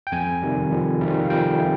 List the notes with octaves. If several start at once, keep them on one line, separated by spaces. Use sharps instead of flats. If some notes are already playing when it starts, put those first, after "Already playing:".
G5
F2 G#5
C3 D#3 G3
F2
C3 D#3 G3
F5
F2 G5
C3